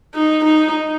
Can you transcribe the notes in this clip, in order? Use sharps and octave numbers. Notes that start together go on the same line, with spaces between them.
D#4
D#4